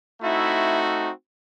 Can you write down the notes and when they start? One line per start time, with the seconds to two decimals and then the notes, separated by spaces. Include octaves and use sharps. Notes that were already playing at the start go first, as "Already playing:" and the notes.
0.21 A3 C4 D#4 E4 F#4 E5